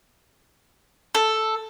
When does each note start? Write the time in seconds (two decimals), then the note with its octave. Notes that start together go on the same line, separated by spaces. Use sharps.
1.15 A4